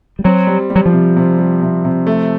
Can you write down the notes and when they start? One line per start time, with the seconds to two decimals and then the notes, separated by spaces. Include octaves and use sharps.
0.19 G3
0.24 F#3 C4
0.47 G3
0.70 G3
0.76 F#3
0.86 F3
0.93 C3
1.16 C3
1.38 G3
1.62 C3
1.85 C3
2.07 A3